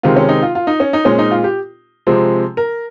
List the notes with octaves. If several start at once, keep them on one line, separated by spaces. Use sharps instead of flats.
C3 D#3 G#3 C4 F4
C#4
D#4
F4
F4
D#4
C#4
D#4
A#2 G#3 C4 C#4
D#4
F4
G4
C3 F3 G#3 C4
A#4